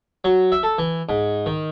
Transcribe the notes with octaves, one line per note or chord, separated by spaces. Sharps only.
F#3
E5
A4
E3
G#2
D#3